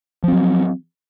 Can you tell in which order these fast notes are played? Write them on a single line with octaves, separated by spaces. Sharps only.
F3 C4 F#3